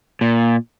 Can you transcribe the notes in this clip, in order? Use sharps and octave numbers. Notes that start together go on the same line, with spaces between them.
A#2